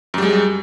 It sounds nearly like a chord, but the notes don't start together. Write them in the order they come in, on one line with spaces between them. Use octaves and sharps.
F#2 G3 G#3